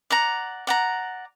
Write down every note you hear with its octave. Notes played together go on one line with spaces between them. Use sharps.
D5 F#5 A#5
D5 F#5 A#5